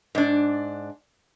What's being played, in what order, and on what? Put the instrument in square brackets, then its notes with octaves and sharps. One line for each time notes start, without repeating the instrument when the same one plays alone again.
[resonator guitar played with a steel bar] G#2 D4